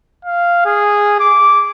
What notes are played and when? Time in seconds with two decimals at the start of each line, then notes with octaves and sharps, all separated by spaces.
0.25 F5
0.65 G#4
1.20 D6